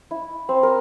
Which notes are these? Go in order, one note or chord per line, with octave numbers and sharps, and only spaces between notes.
E4
C4
A#4